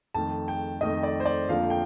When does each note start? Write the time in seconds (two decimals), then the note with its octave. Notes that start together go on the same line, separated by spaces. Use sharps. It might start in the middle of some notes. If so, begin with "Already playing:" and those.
0.14 F2 D#3 A3 A5
0.48 G5
0.81 F2 D#3 A3 D#5
1.03 D5
1.20 C5
1.26 D5
1.48 F2 D3 F3 A#3 F5
1.70 G5